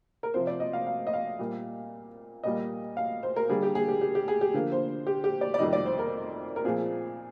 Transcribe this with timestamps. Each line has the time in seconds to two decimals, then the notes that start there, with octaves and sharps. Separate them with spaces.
0.23 A#4
0.34 C3 F3 C4 C5
0.47 D5
0.60 D#5
0.73 F5
0.87 F5
1.07 D#5
1.13 F5
1.39 A#2 G3 A#3
2.44 A#2 G3 A#3 D#5
2.97 F5
3.23 C5
3.36 A#4
3.49 D3 G3 A#3 G#4
3.63 G4
3.75 G#4
3.88 G4
4.01 G4
4.15 G4
4.28 G#4
4.41 G4
4.54 D3 F3 A#3
4.72 C5
5.07 G4
5.24 G4
5.41 D5
5.54 D5
5.59 F2 C3 D#3 G3 D#5
5.73 D5
5.86 C5
5.99 A#4
6.56 A#4
6.64 A#2 F3 C4 G#4